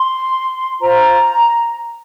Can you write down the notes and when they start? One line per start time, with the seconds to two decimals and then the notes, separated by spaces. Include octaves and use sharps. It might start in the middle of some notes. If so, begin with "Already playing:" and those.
Already playing: C6
0.81 F4 C5 A#5